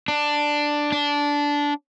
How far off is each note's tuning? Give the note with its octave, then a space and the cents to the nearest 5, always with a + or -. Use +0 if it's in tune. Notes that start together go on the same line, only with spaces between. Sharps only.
D4 +5
D4 -15